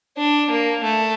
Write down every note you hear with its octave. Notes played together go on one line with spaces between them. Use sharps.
D4
A#3
A3